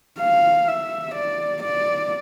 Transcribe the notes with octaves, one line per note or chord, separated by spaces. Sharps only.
F5
E5
D5
D5